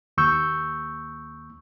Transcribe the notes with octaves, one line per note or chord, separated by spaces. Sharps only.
D#2 C#6 E6 G6